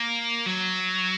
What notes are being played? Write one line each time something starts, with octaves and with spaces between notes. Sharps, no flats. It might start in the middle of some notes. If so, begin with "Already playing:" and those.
Already playing: A#3
F#3